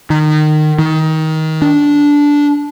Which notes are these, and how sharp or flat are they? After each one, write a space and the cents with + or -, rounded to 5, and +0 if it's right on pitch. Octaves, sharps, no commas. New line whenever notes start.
D#3 -25
D#3 +20
D4 -15